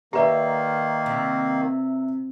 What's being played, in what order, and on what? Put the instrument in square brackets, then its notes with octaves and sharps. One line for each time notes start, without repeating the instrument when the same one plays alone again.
[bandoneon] D#3 A#3 [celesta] G4 B4 D5 [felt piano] E5 A#5
[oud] C3